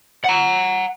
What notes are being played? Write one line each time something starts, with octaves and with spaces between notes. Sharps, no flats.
F#5 A#5